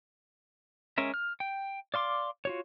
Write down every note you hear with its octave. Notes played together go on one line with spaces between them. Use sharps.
G#3 C#4 A#4 E5
F6
G5
D5 F5 C6 D6
F4 F#4 C#5